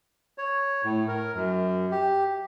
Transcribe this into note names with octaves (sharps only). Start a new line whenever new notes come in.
C#5
A2
A#4
F#2
G4